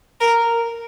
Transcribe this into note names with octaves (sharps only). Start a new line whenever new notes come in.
A#4